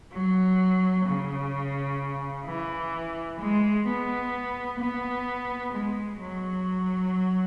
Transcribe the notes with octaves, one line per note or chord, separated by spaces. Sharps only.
F#3
C#3
E3
G#3
B3
B3
G#3
F#3